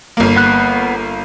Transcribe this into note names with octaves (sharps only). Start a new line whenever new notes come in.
G1 A#3
B3 F#6